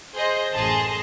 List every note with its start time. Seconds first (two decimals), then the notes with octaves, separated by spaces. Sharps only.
0.15 G#4 C5 D#5
0.54 A1 F#2 G#4 A5 C6 A#6